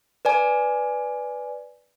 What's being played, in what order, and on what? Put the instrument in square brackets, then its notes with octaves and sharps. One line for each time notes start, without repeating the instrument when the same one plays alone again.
[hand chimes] B4 D5 G#5